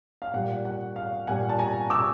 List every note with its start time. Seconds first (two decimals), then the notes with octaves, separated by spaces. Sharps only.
0.22 F5
0.34 A#2 G3 F#5
0.65 F#5
0.96 F5
1.27 A#2 G3 F#5 G#5
1.49 A5
1.59 G#5 A#5
1.90 D6 E6